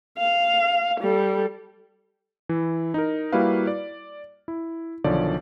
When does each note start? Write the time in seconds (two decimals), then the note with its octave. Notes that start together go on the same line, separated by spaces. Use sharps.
0.18 F5
1.00 G3 A4
2.49 E3 E4
2.94 D#4 A#4
3.32 G3 A#3 E4 F#4 B4 F5
3.67 D5
4.48 E4
5.04 B1 D3 D#3 F3 C#5 D5